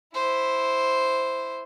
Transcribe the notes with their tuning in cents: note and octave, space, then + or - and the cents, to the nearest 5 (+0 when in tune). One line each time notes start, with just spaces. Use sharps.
E4 +0 C5 +0